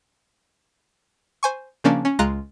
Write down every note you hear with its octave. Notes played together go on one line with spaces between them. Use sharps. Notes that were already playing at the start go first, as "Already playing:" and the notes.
C5 G#5 C#6
C#3 F3 A#3 C#4 D4
C#4
C#2 G#3 F4 A#5 F#6